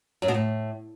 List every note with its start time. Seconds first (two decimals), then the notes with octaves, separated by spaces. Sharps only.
0.22 F#2
0.28 B2
0.34 A2